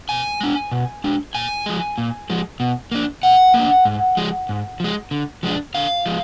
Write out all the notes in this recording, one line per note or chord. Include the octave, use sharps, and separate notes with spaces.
B2 G#5
G#3 D4
B2
G#3 D4
A#2 G#5
F3 G#3
A#2
F3 G#3
B2
A#3 D4
B2 F#5
A#3
D4
G#2
F3 G#3
G#2
F3 G#3
D3
F3 G#3 D4
D3 F5
F3 G#3